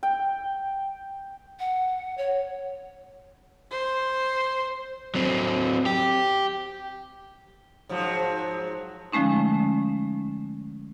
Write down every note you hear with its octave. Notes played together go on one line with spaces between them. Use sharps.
G5
F#5
C#5
C5
F#3 C4
G4
G#2 F3 F#3
D3 F3 G#3 A3 C#4 D#4